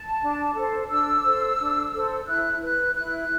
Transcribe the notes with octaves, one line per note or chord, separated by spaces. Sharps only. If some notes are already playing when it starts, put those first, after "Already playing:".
Already playing: A5
D4
A4 C5
D4 E6
A4 C5
D4
A4 C5
E4 F#6
B4 F#6
E4 F#6